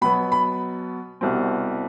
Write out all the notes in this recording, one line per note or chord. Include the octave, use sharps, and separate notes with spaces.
B2 F#3 B3 B5
B5
C2 B2 G3 C4